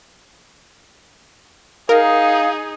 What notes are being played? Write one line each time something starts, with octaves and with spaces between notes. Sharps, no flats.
D#4 G#4 A#4 F5